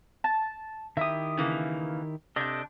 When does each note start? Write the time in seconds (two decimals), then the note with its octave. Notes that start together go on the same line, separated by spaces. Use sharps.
0.24 A5
0.97 D#3 E4 G4 E5 D#6
1.37 C#3 E3 A#3
2.36 C3 D4 A4 D#5 G6